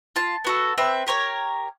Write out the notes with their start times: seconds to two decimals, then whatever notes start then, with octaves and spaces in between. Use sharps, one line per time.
0.16 F4 A5
0.45 B3 F#4 A4
0.78 C4 B4 E5
1.07 G4 A#4 C5 C#5